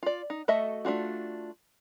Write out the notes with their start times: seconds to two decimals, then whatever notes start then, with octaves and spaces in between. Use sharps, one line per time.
0.03 F4 D5
0.30 D#4
0.48 A3 F#4 A4 D#5 E5
0.85 A3 D4 F4 F#4